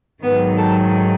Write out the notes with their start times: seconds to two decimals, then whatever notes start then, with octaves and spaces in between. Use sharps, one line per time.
0.23 G#2 D#3 F#3 B3
0.57 A4